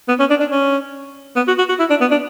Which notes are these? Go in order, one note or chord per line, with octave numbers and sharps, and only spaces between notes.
B3
C#4
D4
D4
C#4
B3
F#4
F#4
F#4
E4
D4
B3
D4